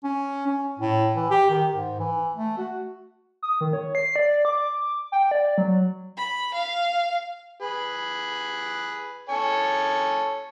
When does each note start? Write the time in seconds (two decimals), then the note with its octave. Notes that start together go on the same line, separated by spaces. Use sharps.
0.04 C#4
0.47 C#4
0.80 A2
1.16 E3
1.30 G4
1.50 D#3
1.74 G#2
2.00 E3
2.34 A3
2.58 F#4
3.43 D#6
3.61 D#3
3.73 C#5
3.95 C7
4.16 D5
4.45 D6
5.12 G5
5.31 D5
5.58 F#3
6.16 B5
6.54 F5
7.61 G#4 B4
9.29 A4 C#5 G#5